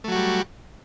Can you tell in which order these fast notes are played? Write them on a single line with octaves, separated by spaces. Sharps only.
A3 F#3 F#4 G3